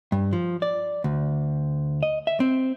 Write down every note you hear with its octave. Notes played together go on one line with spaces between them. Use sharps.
G2
F3
D5
D2
D#5
E5
C4